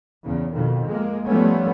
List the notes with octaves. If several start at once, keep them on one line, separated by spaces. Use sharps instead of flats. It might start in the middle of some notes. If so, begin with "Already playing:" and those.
E2 C#3
F2 B2 D#3
G#3 A#3
F3 G3 A3 B3 C#4